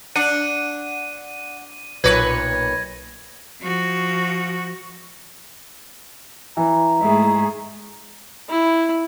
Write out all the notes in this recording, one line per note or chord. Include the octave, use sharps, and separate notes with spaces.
D4 F#5 D#7
B1 A#2 B4 C#5 G#6 A#6
F3 F#4
E3 A#5
G#2 A3 E4 G#4
E4